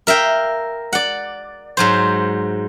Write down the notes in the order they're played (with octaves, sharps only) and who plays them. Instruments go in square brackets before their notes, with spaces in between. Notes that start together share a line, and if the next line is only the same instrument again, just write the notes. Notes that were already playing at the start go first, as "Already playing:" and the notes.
[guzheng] A#4 E5 F5 G5
D5 F#5
G#2 F#3 C5